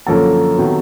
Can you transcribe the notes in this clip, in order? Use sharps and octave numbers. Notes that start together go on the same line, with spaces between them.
F#2 D3 F3 A#3 C#4 A4 A5
C3 D#3 F#3 B3